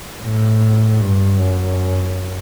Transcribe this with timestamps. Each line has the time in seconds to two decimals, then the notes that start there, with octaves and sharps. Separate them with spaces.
0.22 A2
1.01 G2
1.40 F#2